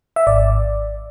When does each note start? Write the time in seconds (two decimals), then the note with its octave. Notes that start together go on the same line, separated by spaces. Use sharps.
0.16 E5
0.27 G#1 D5